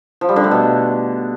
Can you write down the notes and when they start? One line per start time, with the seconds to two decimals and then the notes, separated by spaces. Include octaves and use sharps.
0.21 F3
0.29 G3
0.36 D3
0.44 A3
0.51 B2